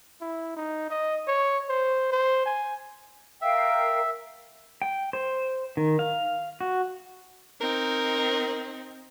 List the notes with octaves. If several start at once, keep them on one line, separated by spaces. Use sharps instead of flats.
E4
D#4
D#5
C#5
C5
C5
G#5
A#4 E5 F5 G5
G5
C5
D#3
F5
F#4
C4 D#4 A#4